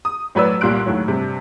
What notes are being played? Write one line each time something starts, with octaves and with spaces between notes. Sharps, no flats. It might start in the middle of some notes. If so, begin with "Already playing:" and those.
D#6
A2 F#3 B4 D5 E6
C2 A#2 G3 C6 F#6 D7
D#2 A2 F#3
G2 C3